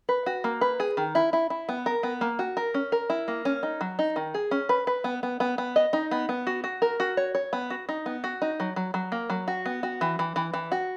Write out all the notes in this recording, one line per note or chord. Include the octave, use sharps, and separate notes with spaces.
B4
F#4
A#3
B4
G#4
D#3
E4
E4
E4
B3
A#4
B3
A#3
F#4
A#4
C#4
A#4
E4
A#3
C#4
D#4
F#3
D#4
D#3
G#4
C#4
B4
B4
B3
B3
B3
B3
D#5
D#4
B3
B3
F#4
F#4
A#4
F#4
C#5
C#5
B3
F#4
D#4
B3
F#4
D#4
F#3
F#3
F#3
A#3
F#3
F#4
B3
F#4
E3
E3
E3
E3
F#4